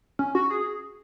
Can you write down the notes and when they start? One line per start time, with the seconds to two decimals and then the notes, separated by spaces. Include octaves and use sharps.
0.19 C#4
0.35 F#4
0.50 G#4